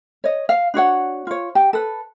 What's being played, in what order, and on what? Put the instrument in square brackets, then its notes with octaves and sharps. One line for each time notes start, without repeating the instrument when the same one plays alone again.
[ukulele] C#5 D#5
F5
D4 F#4 C#5 F#5
F4 C#5
G4 G5
A4 B4